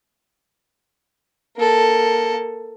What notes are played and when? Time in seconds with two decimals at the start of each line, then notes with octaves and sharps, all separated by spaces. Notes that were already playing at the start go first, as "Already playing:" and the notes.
1.56 A#3 A4